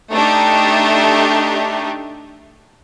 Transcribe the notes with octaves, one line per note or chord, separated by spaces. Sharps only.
A3 D4 D#4 G4